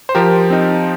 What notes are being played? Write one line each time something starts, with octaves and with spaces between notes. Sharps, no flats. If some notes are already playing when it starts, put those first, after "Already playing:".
C5
F3 G4 A#4
C4 D#4